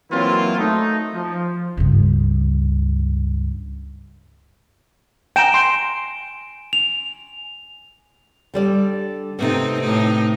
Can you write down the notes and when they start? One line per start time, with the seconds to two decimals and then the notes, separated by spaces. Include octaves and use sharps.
0.11 E3 F#3 A#3 C4 E4 F4
0.58 A3 D#4
1.15 F3
1.77 C#2 G2
5.36 G5 G#5 A#5 D7 E7
5.54 C6
6.73 F7
8.54 D3 G3 D5
9.39 C3 A3 B3 C4 D#4
9.81 A2 D#4